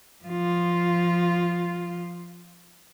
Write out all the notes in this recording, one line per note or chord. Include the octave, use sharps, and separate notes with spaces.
F3 F4